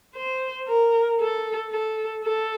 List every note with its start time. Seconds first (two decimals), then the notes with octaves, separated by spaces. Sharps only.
0.15 C5
0.68 A#4
1.20 A4
1.71 A4
2.24 A4